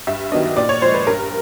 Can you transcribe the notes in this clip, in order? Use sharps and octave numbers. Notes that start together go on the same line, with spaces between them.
G2 E5
D#3 F#3 B3 D4 D#5
A#2 D5
C#5
F3 G#3 C5
B4
G2 A#4